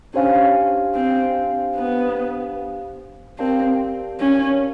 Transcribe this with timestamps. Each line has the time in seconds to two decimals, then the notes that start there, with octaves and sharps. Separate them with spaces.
0.14 C#4 D4 G4 C5 F5 G#5
0.95 C4
1.76 B3
3.39 C4 G4 A#4 D5 F5 A5
4.20 C#4